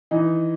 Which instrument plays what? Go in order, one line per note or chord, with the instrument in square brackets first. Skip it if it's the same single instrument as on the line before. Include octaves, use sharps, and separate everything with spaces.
[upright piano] E3 D#4